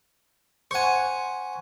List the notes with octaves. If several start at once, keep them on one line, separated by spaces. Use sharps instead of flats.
C5 F#5 G#5 C#6